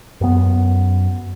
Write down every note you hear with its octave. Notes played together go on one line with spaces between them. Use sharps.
F#2 B3